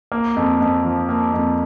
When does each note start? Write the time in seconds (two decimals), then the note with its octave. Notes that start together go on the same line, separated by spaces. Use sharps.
0.12 A#3
0.36 F2
0.60 F2
0.85 F3
1.09 A#3
1.33 F2